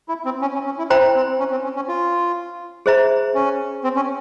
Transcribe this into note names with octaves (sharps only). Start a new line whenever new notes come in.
E4
C4
C#4
C#4
C#4
E4
E4 C5 G5 A#5
C4
C#4
C4
C#4
C#4
F4
G#4 C5 E5 A#5
C#4
C4
C#4